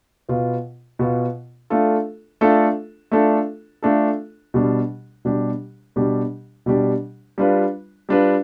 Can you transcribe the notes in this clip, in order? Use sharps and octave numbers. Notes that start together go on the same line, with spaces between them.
B2 B3 F4
B2 B3 F4
A3 D4 F4 A4
A3 D4 F4 A4
A3 D4 F4 A4
A3 D4 F4 A4
B2 G3 D4 G4
B2 G3 D4 G4
B2 G3 D4 G4
B2 G3 D4 G4
G3 D4 F4 B4
G3 D4 F4 B4